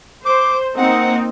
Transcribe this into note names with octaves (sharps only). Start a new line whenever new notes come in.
C5 D6
A#3 C4 D#4 F#5